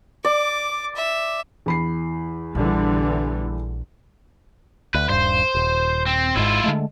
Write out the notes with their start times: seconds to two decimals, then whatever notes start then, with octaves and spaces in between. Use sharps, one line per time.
0.25 D5 D6
0.95 E5
1.66 E2 B5 C7
2.55 A#1 D3 E3 G3
4.94 D2 B4
5.09 D#1 G2 C5
5.55 D#1
6.06 C4
6.36 G#1 G#2 E4 F4
6.64 D3 G#3 A3